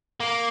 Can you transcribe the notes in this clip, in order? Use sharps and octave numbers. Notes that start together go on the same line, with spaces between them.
A#3